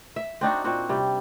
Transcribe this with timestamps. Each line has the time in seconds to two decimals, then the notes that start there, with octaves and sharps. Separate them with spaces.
0.16 E5
0.41 C4 D4 D#4 F#4
0.64 A#2 C4 F#4
0.89 C3 G3